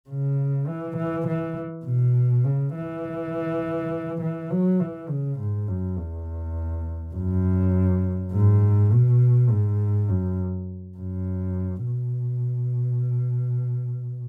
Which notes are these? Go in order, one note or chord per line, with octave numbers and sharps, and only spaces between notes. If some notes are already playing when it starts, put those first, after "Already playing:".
C#3
E3
E3
E3
B2
C#3
E3
E3
F#3
E3
C#3
G#2
F#2
E2
F#2
G#2
B2
G#2
F#2
F#2
B2